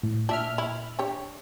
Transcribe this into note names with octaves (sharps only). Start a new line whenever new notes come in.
A2
A#2 D4 E5 F6
E4
D4 G4 C#5